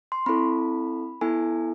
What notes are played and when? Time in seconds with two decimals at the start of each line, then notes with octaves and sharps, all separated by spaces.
0.12 C6
0.26 C4 E4 A4 B5
1.21 B3 E4 A4 G#5